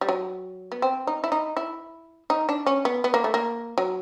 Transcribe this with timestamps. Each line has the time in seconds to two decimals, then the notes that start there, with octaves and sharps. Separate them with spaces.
0.01 G3
0.09 F#3
0.72 B3
0.82 C4
1.07 D#4
1.24 E4
1.32 D#4
1.57 E4
2.30 D#4
2.49 D4
2.66 C#4
2.85 B3
3.04 B3
3.14 A#3
3.24 A3
3.34 A#3
3.78 F#3